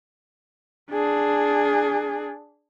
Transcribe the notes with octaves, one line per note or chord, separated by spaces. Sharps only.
D4 G#4